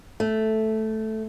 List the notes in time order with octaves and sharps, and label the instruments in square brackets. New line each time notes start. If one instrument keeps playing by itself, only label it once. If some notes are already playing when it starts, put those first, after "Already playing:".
[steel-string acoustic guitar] A3